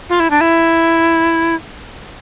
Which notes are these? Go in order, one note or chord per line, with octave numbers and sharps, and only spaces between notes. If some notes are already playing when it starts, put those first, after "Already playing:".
F4
E4
D4
E4